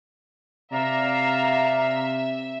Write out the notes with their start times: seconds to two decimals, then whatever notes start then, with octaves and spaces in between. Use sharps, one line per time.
0.72 C3 D5 E5 F5 A#5